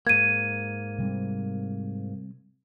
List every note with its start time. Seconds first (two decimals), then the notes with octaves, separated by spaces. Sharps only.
0.07 G#2 A#3 G#6 D#7
0.98 C3 G3 C4